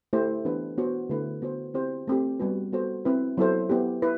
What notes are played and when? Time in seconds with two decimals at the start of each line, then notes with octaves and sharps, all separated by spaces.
0.13 A3 E4 G4 C5
0.45 E3 B3 D4 G4 B4
0.78 B3 F#4 C5
1.09 D3 A3 E4 B4
1.42 B3 F#4 C5
1.74 C4 E4 G4 C5
2.08 A3 C4 G4
2.40 G3 B3 F#4 B4
2.73 B3 F#4 A4 C5
3.05 C4 E4 B4
3.38 F#3 B3 E4 A4 C5
3.70 B3 E4 G4
4.02 E4 B4